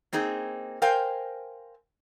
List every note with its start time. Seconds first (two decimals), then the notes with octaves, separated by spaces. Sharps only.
0.13 A#3 C4 D#4 G#4
0.82 A#4 C5 F5 G5 G#5